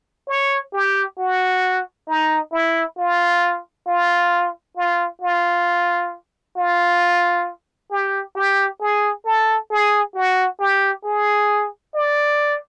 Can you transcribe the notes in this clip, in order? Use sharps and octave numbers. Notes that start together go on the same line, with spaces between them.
C#5
G4
F#4
D#4
E4
F4
F4
F4
F4
F4
G4
G4
G#4
A4
G#4
F#4
G4
G#4
D5